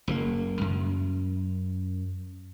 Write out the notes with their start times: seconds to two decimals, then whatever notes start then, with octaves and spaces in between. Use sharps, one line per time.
0.08 F#1 C#3 A#3
0.61 F#2